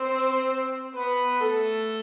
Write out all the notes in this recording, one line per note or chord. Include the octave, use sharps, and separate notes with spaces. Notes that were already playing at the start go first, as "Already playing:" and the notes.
Already playing: C4 C5
B3 B4
A3 A4